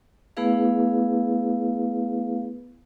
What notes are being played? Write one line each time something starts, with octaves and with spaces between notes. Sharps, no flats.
A3 B3 E4 G#4 B4 F5